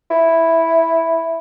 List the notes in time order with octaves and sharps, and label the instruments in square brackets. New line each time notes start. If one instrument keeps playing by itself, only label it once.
[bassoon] E4